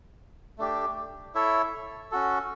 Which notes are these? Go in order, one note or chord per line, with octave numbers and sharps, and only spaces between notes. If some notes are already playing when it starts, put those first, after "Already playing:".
A3 D4 G4
E4 A4 C#5 E5
C#4 F#4 A4